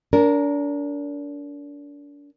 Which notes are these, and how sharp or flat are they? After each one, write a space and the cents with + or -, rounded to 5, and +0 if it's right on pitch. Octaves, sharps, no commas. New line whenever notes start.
D4 -35 A#4 +0